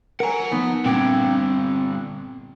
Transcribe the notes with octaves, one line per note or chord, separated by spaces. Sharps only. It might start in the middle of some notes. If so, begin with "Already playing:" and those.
A#4 F#5 G#5 A#5
F3 B3 D#4
G2 A#2 D3 C4 G5 D6 G#6